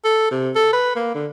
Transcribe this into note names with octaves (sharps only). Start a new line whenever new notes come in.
A4
C3
A4
B4
A#3
D3